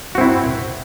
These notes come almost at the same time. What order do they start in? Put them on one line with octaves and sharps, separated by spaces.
F#4 C4 E4